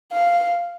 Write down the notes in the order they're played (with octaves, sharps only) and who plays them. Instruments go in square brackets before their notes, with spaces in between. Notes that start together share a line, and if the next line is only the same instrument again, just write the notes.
[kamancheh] F5